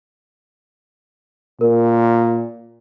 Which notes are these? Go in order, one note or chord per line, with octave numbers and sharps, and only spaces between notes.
A#2 A#4